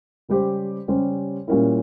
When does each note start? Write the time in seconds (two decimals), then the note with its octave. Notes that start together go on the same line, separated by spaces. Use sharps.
0.29 C#3 G3 C#4 G4 C5
0.88 C#3 G3 C#4 G4 C5
1.47 A#2 G3 C#4 E4 A#4